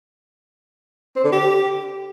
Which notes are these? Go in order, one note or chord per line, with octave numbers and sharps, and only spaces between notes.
C4
D3
G4